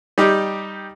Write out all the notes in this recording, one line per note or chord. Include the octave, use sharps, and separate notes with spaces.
G3 D#4 G4